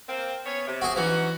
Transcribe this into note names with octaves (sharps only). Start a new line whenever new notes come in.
A#3 C4
B3 C#4 C#5
C3
F#4 G#4
E3 C#4 D#4 F#4